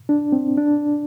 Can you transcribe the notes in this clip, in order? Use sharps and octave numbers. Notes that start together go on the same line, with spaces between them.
D4
C4
D4